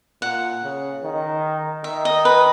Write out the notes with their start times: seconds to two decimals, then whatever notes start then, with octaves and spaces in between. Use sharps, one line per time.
0.22 A#2 F#5
0.63 C#3
1.03 D#3
1.84 D#3 E5
2.05 D#5
2.25 B4